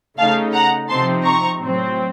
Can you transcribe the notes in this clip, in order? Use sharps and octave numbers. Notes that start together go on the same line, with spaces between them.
C#3 A3 D#4 F5 A5
F#5 A#5
C3 F3 C4 D#4 A5 C6
A#5 C#6
A2 F#3 C4